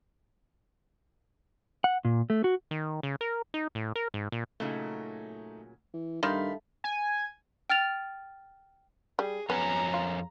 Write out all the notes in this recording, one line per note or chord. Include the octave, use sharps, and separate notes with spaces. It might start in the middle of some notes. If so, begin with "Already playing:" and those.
F#5
A#2
A3
F#4
D#3
C#3
A#4
D#4
A2
A#4
G#2
A#2
A#2 C#3 F#3 A3 D#4
E3
G2 D#3 A3 F5 B5 C6
G#5
G5 F6 A6 F7
G3 G#4
F2 B3 C#5 G#5 A#5
F4